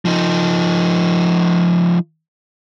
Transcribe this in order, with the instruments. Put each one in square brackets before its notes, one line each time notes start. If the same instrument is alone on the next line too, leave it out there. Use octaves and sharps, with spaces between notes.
[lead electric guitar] F3 D#4